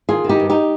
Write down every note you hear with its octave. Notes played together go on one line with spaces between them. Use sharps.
D#3 F4 G#4
D#3
D#4 G4
G2
D#4 G4